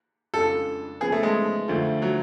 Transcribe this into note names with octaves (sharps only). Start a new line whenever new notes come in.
F2 C#3 G#3 D4 F4 A4
C#3 F3 B3 G#4
A3
G#3
D2 D3 F3 A3 F4
F#3